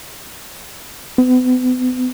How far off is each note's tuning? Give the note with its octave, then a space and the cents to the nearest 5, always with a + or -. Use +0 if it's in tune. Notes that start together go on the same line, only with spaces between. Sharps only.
B3 +40